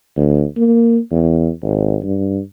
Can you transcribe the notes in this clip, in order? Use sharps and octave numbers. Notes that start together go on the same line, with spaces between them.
D2
A#3
E2
G#1
G2